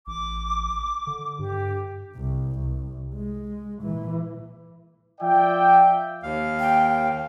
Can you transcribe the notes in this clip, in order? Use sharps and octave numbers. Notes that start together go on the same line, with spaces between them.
A1 D6
D3
G2 G4
C2
C2
G#3
A#2 E3
F3 F4 D5 E5 G5
D#2 F5
G5